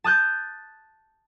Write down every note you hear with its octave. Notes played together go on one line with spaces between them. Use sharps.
A5 D#6 F#6 G6 A6